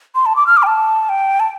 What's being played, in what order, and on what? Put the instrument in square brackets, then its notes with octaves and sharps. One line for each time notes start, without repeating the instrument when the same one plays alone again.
[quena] C6
A5
D6
F6
D6
G5
A5
G5
A5